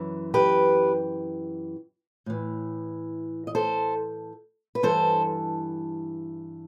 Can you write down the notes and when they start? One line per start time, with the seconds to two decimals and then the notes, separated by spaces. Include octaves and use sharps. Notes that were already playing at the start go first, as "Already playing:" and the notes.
Already playing: F#2 E3
0.34 G4 B4
2.26 A2 E3
3.47 D#5
3.55 A4 C5
4.75 B4
4.83 G2 E3 A4 C5